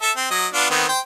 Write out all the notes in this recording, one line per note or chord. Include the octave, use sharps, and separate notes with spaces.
A4 E5
C4
F#3 D#5
B3 D4 F4
D#3 B3 C4
C5 G5